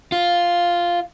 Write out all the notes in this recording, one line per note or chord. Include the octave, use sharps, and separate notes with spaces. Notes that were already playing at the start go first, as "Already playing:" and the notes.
F4